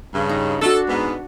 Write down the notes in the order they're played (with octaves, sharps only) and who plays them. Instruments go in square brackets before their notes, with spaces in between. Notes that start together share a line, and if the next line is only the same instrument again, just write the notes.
[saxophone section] G2 C#3
[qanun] D#4
[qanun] D4 F#4 [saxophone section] A4
[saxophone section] G#2 B3